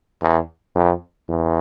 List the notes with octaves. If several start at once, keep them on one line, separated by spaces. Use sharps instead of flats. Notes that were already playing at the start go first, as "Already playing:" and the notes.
E2
F2
E2